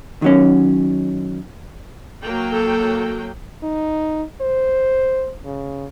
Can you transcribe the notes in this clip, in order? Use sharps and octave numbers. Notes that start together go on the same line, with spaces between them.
D#3 F#3 C#4
F#3 A#3 G5
A4
D#4
C5
C#3